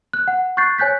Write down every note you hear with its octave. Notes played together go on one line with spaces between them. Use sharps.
F#6
F#5
C#6 F#6 G6 A6 C7
C#5 G#5 F#6 G6 B6